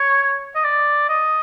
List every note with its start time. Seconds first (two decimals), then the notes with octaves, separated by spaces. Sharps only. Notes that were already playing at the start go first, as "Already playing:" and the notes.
Already playing: C#5
0.55 D#5
0.64 D5
1.09 D#5